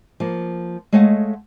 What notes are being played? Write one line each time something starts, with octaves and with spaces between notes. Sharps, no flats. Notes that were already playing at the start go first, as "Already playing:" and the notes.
F3 A#3
G#3 A3 C#5 D#5 F5 F#5